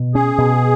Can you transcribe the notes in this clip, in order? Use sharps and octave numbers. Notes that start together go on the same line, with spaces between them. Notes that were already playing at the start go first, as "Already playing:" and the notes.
Already playing: B2
C#4 G#4
B2